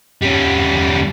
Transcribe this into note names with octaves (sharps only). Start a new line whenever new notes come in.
G3 C#4